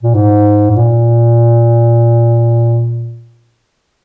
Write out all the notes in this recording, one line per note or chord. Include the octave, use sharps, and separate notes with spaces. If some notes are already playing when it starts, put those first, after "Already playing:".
A#2
G#2
G#2
A#2